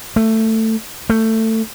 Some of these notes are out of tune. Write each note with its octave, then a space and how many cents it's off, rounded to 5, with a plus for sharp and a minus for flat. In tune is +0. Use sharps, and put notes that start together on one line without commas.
A3 +15
A3 +20